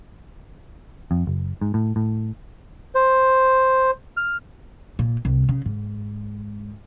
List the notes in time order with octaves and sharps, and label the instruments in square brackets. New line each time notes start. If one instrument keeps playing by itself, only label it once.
[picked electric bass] F2
F#1
G#2
A2
A2
[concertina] C5
F6
[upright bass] A#2
C2
C#3
G#2